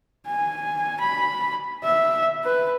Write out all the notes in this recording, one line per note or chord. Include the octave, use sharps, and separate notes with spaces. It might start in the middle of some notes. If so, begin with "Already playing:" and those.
G#5
B5
E5
B4